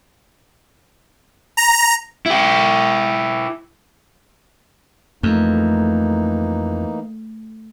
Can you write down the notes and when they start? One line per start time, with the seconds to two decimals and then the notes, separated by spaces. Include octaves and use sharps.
1.57 A#5
2.26 E4 G4
5.23 F2 E3 A3 A#3 D#4